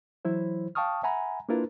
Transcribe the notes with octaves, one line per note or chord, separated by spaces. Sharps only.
E3 F#3 E4 C5
F5 G5 A5 C#6 D#6 F6
E5 F#5 G#5 A#5 B5
A#3 D4 E4 F4 A#4 B4